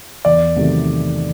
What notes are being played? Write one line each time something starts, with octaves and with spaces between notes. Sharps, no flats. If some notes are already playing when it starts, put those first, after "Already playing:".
E2 D5
C3 D#3 F#3 A3